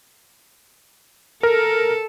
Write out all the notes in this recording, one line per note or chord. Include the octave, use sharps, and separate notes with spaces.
A4 A#4